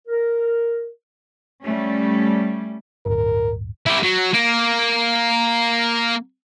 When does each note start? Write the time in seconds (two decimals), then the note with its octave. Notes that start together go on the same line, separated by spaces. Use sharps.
0.08 A#4
1.64 G3 A3 C#4
3.06 D1 G1 A#4
3.86 E4 G4
4.03 F#3
4.34 A#3